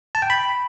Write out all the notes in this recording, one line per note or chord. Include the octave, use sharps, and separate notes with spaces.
A5
G5
B5